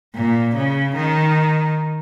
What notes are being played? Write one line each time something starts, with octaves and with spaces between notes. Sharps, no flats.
A#2
C#3
D#3